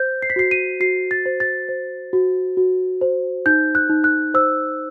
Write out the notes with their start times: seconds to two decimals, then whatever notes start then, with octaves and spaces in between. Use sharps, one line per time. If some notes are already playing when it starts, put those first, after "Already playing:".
Already playing: C5 G6
0.22 C7
0.30 B6
0.36 F#4 C7
0.51 D#7
0.80 F#4 C7
1.11 A6
1.26 C5
1.40 A6
1.69 C5
2.13 F#4
2.57 F#4
3.01 C5
3.46 D#4 G6
3.75 F#6
3.89 D#4
4.04 F#6
4.34 C5 E6